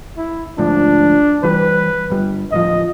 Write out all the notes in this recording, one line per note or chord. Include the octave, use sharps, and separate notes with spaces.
E4
D2 G#2 F3 D4
E3 F#3 G3 B4
G1 G3
D1 F3 D#5